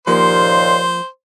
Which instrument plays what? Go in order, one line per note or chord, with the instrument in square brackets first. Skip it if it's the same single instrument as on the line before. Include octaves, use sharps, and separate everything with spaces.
[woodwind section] D#2 A#2 [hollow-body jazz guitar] F3 A#3 [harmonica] C5 [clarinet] C6